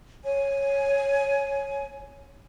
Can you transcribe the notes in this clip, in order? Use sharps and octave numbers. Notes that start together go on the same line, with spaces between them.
C#5 G#5